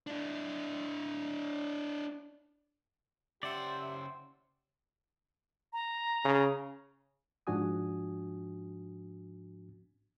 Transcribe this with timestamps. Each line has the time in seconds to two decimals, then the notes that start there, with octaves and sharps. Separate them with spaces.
0.07 D4 E4
3.43 C#3 G4 C5 D5 E5 F#5
5.73 A#5
6.25 C#3
7.47 G#2 F3 D4 F#4 G#5 D#6